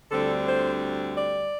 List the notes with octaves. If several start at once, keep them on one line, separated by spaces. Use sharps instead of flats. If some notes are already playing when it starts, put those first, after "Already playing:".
D2 D3 G3 C4 A4
C5
D5